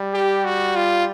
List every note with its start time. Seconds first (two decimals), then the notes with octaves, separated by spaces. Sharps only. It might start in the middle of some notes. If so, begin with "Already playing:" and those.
Already playing: G3
0.14 G4
0.45 F#4
0.76 F4